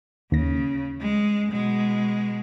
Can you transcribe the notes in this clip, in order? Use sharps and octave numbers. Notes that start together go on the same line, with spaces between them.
D#2 C#3 A#6
G#3
B2 G#3